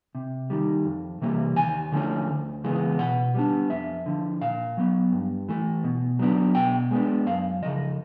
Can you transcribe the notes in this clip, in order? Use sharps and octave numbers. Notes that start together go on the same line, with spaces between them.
C3
D#3 G3
F2
C3 E3 G3 A#3
D#2 G#5
D3 F3 A3 C#4
D2
C#3 E3 G#3 B3
B2 F#5
G3 B3 D4
F2 E5
D3 F3
A#2 F5
F#3 B3
G2
E3 A3
B2
F#3 B3 D4
B2 G5
G#3 B3 D4
F#2 F5
C#3 F3 D#5